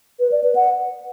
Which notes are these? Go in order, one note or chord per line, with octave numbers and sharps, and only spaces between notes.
B4
D5
B4
F#5